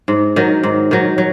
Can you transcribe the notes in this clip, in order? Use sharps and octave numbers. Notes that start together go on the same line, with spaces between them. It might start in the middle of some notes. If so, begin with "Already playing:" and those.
G#2
D#3 F#3
G#2
D#3 F#3
F#3